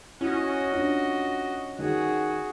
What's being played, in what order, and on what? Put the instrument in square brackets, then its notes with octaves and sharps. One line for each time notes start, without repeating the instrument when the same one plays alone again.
[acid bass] C#4 [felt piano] E4 [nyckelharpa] F#4 D#5
[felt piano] D4 F4
[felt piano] D#3 [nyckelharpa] F#4 G#4